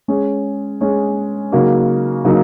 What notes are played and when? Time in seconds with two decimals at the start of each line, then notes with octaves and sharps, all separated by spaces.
0.08 G#3 C#4 G#4 C#5
0.81 G#3 C#4 G#4 C#5
1.52 C#3 F#3 A#3 D#4 F#4
2.25 C#3 F#3 A#3 D#4